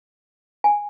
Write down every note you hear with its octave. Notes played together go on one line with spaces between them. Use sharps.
G#5